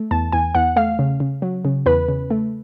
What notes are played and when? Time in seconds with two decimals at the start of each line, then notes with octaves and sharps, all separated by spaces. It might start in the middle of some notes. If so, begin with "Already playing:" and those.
Already playing: A3
0.11 E2 A5
0.32 E2 G#5
0.55 E2 F#5
0.76 A3 F5
0.99 C#3
1.20 C#3
1.42 F#3
1.65 C#3
1.86 E2 B4
2.08 C#3
2.31 A3